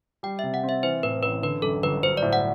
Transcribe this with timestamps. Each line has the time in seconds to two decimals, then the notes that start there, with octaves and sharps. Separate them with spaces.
0.23 G3 G5
0.39 C3 E5
0.54 F#5
0.63 C4
0.69 E5
0.83 E3 C5
1.03 A2 B4
1.23 A1 B4
1.43 D3 B4
1.62 F#2 A4
1.83 G1 B4
2.02 F#3 C5
2.17 D5
2.22 A2
2.33 F#5